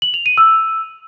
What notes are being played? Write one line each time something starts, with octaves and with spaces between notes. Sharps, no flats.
F#7
F7
D#7
E6